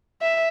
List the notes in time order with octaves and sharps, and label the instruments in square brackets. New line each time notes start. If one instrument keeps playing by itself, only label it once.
[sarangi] E5